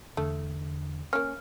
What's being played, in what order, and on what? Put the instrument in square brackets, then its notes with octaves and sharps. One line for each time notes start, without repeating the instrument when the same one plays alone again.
[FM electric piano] E2 D3 [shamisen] A3
[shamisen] A#3 C#4 [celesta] F6